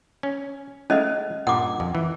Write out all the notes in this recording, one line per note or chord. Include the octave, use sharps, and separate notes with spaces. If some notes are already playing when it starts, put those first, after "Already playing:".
C#4
G#3 A3 C#4 D#5 F5
G2 A#2 F#5 D6
F2
E3